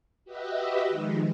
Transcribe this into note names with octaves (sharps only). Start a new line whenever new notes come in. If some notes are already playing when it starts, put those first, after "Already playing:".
F#4 G4 B4 D#5 E5
D#3 F3 G#3 D#4